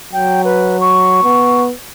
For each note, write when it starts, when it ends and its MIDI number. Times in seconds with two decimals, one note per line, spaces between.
0.13 1.19 54
0.13 0.42 79
0.45 0.79 71
0.81 1.63 85
1.24 1.71 59